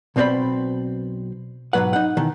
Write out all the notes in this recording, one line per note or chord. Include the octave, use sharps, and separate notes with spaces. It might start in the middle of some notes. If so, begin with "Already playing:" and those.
B1 B2 C4 C5 D5 B5
G#2 B2 D#3 F#3 B4 F#5
D#4 F#5
B2 D#3 E3